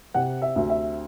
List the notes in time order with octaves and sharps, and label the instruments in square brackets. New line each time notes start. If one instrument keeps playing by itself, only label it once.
[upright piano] C3 F#5
E5
D2
E5